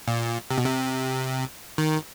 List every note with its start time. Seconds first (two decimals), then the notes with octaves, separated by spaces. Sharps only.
0.08 A#2
0.50 C3
0.58 B2
0.65 C3
1.78 D#3